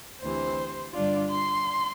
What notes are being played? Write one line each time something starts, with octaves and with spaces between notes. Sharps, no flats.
D2 C3 E3 C5
G2 D3 G3 D4 F4 D5
C6